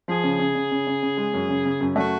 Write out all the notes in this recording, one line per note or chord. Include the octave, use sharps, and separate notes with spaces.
F3 G#4
C#3
C#3
C#3
C#3
C#3
C#3
G#3
F#2
C#3
C#3
F#2
A3 F#4